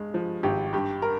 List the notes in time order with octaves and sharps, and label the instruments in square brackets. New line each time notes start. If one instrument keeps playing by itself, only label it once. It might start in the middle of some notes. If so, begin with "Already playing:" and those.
Already playing: [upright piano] G2 G#3
F3
G#1 G4
G2 G4
A#4